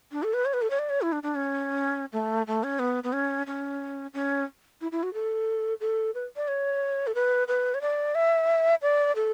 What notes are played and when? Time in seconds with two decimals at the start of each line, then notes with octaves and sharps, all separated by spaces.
0.12 D4
0.23 A4
0.34 B4
0.45 C#5
0.53 B4
0.62 A4
0.70 C#5
0.79 D5
0.90 C#5
1.02 E4
1.12 D4
1.23 D4
1.35 C#4
2.13 A3
2.47 A3
2.64 C#4
2.79 B3
3.04 B3
3.13 C#4
3.47 C#4
4.14 C#4
4.81 E4
4.92 E4
5.03 F#4
5.14 A4
5.81 A4
6.15 B4
6.36 D5
6.48 C#5
7.07 A4
7.15 B4
7.48 B4
7.74 C#5
7.81 D5
8.15 E5
8.82 D5
9.16 A4